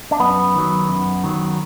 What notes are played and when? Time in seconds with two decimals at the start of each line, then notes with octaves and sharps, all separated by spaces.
0.11 D4
0.19 F#2 B3
0.55 D#3 F#3
0.89 F#2
1.24 D#3 F#3